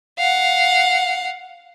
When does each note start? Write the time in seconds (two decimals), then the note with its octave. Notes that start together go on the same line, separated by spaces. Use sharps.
0.19 F5 F#5